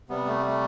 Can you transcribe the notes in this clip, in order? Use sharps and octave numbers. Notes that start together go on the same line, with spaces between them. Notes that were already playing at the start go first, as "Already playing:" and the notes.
C3 G3 B3
A3
A3